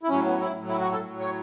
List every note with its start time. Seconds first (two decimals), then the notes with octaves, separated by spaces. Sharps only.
0.03 E4
0.09 A2 F#3 C#4
0.25 B3
0.41 E4
0.57 A2 F#3
0.68 E4
0.80 F#4
0.92 A4
1.04 A2 F#3
1.20 C#5